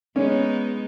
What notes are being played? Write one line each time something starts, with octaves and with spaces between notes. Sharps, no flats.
G#3 B3 C#4 D#4